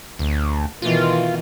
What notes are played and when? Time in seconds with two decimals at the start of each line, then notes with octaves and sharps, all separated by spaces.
0.19 D2
0.82 B2 D#3 E3 F4